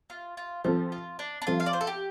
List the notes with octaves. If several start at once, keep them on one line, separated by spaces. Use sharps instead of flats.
F4
F4
F3 C4 F4 A4
F4
D4
D4
F3 C4 F4 A4
F5
D5
C5
A4
G4